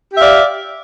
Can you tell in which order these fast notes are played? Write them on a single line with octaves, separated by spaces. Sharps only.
G4 E5 F5 D5